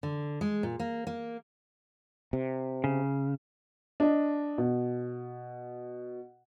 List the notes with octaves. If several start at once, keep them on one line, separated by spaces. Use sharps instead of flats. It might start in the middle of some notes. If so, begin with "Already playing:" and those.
D3
G#3
A#2
A#3
A#3
C3
C#3
D4 D#5
B2